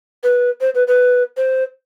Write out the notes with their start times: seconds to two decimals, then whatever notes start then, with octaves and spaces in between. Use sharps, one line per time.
0.23 B4
0.61 C5
0.75 B4
0.87 B4
1.37 C5